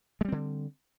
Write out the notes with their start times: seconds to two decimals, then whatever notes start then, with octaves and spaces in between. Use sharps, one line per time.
0.21 G#3
0.25 G3
0.28 C4
0.32 D3